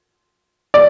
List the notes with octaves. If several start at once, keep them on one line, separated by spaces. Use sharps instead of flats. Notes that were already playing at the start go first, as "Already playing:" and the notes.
D5